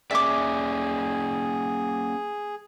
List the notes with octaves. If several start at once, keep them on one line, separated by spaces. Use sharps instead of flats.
A#3 C#4 G#4 D5 E5 D6